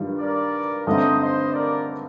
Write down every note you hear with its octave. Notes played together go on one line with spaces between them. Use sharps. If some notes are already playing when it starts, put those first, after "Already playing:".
Already playing: G2 D#3 G3 D4 F4
A#4 D5
G2 D3 A3 C4 D#4 C5 D#5
C5 D#5
A#4 D5